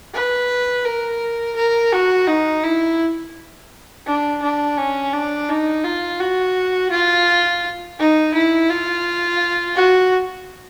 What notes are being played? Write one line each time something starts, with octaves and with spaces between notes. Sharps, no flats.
B4
A#4
A#4
F#4
D#4
E4
D4
D4
C#4
D4
D#4
F4
F#4
F4
D#4
E4
F4
F#4